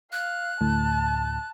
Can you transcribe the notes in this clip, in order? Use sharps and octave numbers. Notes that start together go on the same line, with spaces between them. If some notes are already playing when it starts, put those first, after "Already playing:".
F5 F#6
D2 A2 A5